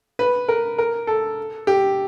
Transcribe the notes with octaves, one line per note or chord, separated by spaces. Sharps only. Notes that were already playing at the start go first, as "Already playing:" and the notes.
B4
A#4
A#4
A4
G4